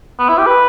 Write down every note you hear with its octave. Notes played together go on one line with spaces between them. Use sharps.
B3
E4
G4
B4